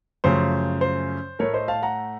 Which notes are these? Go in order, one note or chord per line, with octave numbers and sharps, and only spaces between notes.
F#2 C#3 F3 A3 C5
C5
A2 A3 A#4 C#5
C5 D#5
F5 A5
F#5 A#5